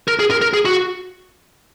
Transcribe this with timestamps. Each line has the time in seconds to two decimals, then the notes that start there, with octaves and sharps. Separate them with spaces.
0.08 A#4
0.19 G#4
0.31 A#4
0.42 A#4
0.53 G#4
0.65 F#4